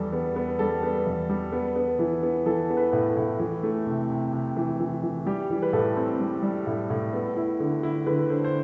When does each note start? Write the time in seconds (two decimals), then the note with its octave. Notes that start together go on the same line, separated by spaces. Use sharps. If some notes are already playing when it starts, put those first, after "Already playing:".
Already playing: E2 G3 A4
0.13 B3
0.36 B3
0.59 G3 A4
0.83 B3
1.07 E2
1.30 G3
1.53 B3
1.76 B3
1.99 E3
2.23 B3
2.46 E3 A4
2.70 B3
2.77 B4
2.93 A2
3.09 A4
3.17 A2
3.39 E3
3.63 A3
3.87 C3
4.10 C3
4.33 C3
4.57 E3
4.80 E3
5.03 E3
5.26 G3 G4
5.50 E3
5.62 B4
5.73 A2 A4
5.97 C4
6.20 G3
6.43 G3
6.67 A2
6.90 A2
7.13 B3
7.36 E4
7.60 D3
7.83 E4
8.06 D3 B4
8.30 D3 C5
8.44 C5